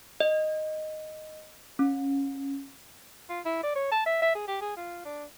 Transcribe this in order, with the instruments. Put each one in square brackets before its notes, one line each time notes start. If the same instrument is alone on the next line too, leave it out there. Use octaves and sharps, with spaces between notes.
[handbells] D#5
C#4
[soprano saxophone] F4
E4
D5
C#5
A5
E5
E5
G#4
G4
G#4
F4
D4